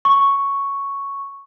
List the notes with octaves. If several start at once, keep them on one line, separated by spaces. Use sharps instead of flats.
C#6